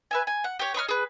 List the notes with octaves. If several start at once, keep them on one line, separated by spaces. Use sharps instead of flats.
B4 E5 G#5
G#5
F#5
G4 C#5
C#5 D#5 B5 F6
G#4 B4